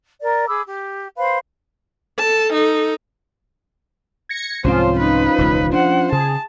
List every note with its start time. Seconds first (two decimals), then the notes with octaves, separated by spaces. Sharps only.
0.21 A#4 D5
0.48 G#4 B5 D6 E6
0.65 G4
1.17 B4 C5 F5 B5
2.19 A4 A5
2.53 D#4 A4
4.29 G#6 A#6 C#7
4.64 C2 G#2 F3 C4 C#4 F4 C5
4.99 D#4 B4
5.38 E1 C#2
5.73 D4 C5 F#5
6.12 C#3 G#4 A5